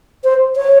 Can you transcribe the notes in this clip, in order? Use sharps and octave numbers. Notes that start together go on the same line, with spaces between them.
C5
C#5